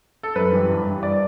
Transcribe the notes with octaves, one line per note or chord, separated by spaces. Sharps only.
A4
F#2 B4
E3 G3
G2
E3 G3
D5